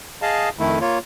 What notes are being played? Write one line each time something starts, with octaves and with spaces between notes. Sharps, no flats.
G#4 D#5 F5 A5
F2 D#3 A3 E4
A#3 F4 C#5